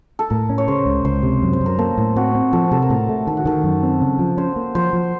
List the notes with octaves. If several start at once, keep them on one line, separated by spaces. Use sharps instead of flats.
A4
A2 A#4
C#4
C#5
C#3 C5
C#2
C#2 C5
C3
F#2
C5
F#2
A#4
A#3 A4
A2
C4 F#4
C4
F3 A4
C3 A4
A#4
A2 A4
A3
D#3 A4
F#4
D#3 A4
F#2
C4
C#3
F3
C#4 C5
A#3
F3 C5
F3